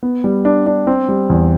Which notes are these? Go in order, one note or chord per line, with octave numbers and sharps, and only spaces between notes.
B3
G3
D4
D4
C4
G3
E2